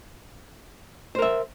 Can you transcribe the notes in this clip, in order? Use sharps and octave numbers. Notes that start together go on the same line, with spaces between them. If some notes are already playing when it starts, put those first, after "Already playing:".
A#4 C5 E5